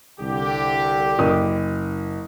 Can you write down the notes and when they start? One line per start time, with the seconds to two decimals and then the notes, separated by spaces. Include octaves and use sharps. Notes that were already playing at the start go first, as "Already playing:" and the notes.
0.20 C2 D3 G4
1.19 F#1 D#6